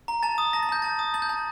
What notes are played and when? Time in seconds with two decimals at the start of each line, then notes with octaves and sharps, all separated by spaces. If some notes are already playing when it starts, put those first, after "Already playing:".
0.08 A#5
0.23 A5 A6
0.38 D#6
0.53 A5 A#6
0.63 A6
0.69 A5 G6
0.82 A5 A6
0.99 D#6
1.14 A5 A6
1.22 G6
1.29 A5